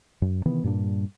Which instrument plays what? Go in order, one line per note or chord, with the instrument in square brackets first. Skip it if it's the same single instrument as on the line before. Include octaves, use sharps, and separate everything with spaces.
[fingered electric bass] F#2
C3 D#3 E3 B3
G2 A#2 G3 D4